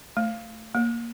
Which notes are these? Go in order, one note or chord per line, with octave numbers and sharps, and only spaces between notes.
A3
A#3